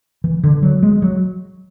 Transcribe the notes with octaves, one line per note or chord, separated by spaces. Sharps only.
E3
D3
F#3
G#3
F#3